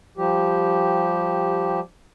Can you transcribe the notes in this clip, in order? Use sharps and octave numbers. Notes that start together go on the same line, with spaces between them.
F3 G3 G4